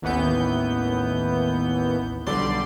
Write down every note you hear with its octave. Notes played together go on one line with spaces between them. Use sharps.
A1 D#2 E3 B3 G6
B1 D3 G3 D5 C6